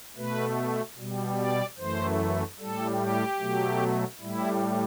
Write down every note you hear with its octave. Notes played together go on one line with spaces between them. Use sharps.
B2 A3 B4
B2 G3
D5
F#2 E3 A3 C5
A2 G3 A4
G4
B2 F#3 A3
A2 G3 E4